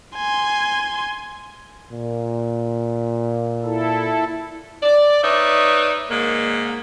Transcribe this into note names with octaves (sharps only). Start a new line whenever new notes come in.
G#5 C6
A#2
E4 A4
D5
D#4 B4 C#5 D5 E5
G#2 D#3 A#3